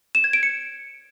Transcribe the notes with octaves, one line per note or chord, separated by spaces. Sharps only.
E7
G#6
D7
C#7